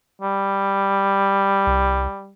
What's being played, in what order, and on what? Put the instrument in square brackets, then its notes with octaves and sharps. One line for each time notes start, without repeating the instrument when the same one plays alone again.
[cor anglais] G3
[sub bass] C2